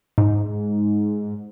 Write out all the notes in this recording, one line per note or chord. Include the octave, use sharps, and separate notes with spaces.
G#2